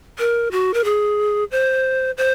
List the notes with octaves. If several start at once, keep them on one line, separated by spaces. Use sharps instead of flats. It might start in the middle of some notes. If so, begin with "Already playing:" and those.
A#4
F#4
A#4
G#4
C5
C5